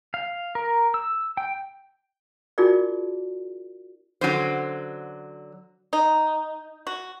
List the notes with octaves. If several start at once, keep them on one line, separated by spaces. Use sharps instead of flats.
F5
A#4
E6
G5
D#4 F4 F#4 G#4 A#4 D5
D3 F#3 C#4 C5
D#4
F#4